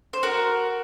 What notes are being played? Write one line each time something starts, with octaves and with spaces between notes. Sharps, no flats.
C5
F#4 A#4